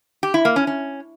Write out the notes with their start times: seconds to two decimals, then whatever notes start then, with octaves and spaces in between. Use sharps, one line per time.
0.23 G4
0.34 E4
0.45 A#3
0.56 C#4
0.67 C#4